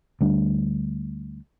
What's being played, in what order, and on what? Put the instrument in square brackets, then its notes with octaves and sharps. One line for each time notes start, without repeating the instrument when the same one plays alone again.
[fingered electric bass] D2 G3 D4